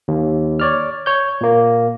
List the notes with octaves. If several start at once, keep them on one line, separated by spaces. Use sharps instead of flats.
D#2
C#5 D5 F6
C#5 G6
A#2 A#3